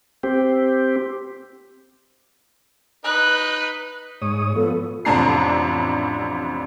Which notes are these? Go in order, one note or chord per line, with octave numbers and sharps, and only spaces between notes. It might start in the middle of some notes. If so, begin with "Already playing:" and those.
C4 G4
D#4 B4 F#6
G#2 C#5 D#6
F3 B3 A4
A1 F2 C3 D4 A#5 C7